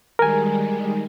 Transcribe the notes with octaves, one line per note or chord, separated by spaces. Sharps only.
D#3 G3 G#3 A#4 G#5